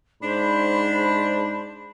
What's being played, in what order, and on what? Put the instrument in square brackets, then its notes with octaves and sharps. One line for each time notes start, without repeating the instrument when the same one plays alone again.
[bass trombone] G#2 [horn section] D4 [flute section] C5 B5